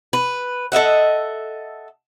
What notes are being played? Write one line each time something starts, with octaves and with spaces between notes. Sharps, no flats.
B4
A4 D#5 E5 F#5